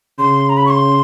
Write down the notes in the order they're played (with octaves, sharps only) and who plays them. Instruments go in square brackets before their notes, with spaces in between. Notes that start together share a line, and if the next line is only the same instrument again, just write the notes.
[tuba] C#3 [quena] C6
[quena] A#5
B5
C#6
C6